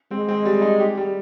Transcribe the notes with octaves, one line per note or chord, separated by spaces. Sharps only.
G#3 C4
C4
G3
D#4
G4
G3